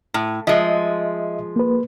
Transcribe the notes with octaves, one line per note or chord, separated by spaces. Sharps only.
A2
F3 G#3 D#5 E5
A#3 B4